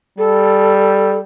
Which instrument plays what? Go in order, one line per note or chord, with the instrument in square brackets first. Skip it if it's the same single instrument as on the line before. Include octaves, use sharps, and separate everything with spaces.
[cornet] G3 [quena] A4